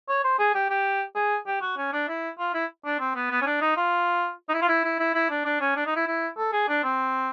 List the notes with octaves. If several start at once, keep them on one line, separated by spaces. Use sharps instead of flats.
C#5
C5
G#4
G4
G4
G#4
G4
F#4
C#4
D4
E4
F4
E4
D4
C4
B3
B3
C#4
D4
D#4
F4
D#4
E4
F4
E4
E4
E4
E4
D4
D4
C#4
D4
D#4
E4
E4
A4
G#4
D4
C4